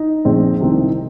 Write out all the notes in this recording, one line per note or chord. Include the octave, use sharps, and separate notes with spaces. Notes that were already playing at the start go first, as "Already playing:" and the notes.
Already playing: D#4 D#5
A#1 A#2 G#3 C4
C2 C3 D#3 C4